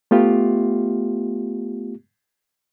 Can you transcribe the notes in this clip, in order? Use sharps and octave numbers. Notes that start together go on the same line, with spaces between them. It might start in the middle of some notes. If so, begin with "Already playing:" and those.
A3 B3 F4 G4